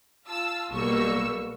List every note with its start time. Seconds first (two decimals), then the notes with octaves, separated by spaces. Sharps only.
0.27 F4 A5 E6
0.72 B1 B2 G3 A#3 C#6 E6